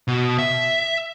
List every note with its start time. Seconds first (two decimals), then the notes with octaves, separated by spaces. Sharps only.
0.08 B2
0.39 E5